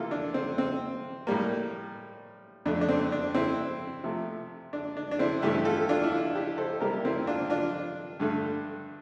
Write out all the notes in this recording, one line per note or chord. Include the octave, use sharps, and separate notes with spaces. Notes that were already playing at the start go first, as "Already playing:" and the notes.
Already playing: C3 E3 A#3 F4 A4
D4
C4
C4
A2 G3 A#3
F2 D3 A3 D4
D4
C4
D4
C4 E4
C3 F3 A3
D4
D4
D4
C4 E4
G2 E3 A3 E4 G4
F4 A4
D4 F4
E4
D4 F4
E4 G4
A4 C5
C3 G3 A#3 G4 A#4
C4 E4
D4 F4
D4 F4
G2 D3 A3